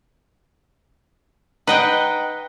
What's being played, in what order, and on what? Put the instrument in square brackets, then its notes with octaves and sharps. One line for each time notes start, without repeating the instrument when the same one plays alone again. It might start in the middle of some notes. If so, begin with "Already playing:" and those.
[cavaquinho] D#4 F#5 [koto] B4 D#5 G5